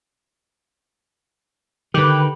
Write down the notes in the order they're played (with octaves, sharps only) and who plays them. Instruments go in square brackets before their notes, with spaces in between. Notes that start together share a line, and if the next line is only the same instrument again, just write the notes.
[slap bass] D3 D#3 [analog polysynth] G4 B4